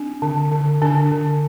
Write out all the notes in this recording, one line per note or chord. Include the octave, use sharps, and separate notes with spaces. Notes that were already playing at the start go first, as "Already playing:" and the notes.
Already playing: C4 D4
D3
D3
D3 D4
D3